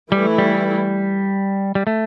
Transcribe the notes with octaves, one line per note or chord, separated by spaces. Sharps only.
E3 G3 A3 E4
G3
G3
A3